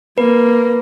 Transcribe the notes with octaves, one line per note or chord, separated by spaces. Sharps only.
A#3 B4